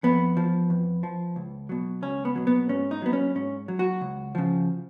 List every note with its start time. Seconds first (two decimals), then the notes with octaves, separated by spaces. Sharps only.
0.03 F2 B3
0.37 F3
0.70 F2
1.03 F3
1.36 C#2
1.69 B2 F#3
2.02 C#2 C#4
2.25 B3
2.35 B2 F#3
2.47 B3
2.69 G#2 C#4
2.91 D#4
3.02 F#3 B3
3.13 C#4
3.35 G#2 C#4
3.68 F#3
3.79 F#4
4.01 C#2
4.35 C#3 F3